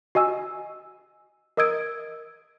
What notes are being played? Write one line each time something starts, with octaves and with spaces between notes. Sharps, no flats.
F#4 D#5 G#5 E6
A#4 D#5 D#6 E6 G#6 D7